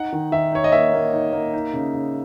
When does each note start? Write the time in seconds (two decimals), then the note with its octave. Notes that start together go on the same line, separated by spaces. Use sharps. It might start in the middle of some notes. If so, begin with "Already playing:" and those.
Already playing: D#4 F#5
0.13 D#3
0.32 D#3 E5
0.52 D#4 C#5
0.64 D#5
0.72 A#3 E5
0.93 A#3
1.13 D#4
1.33 A#3
1.53 D#4
1.73 C#3
1.94 C#3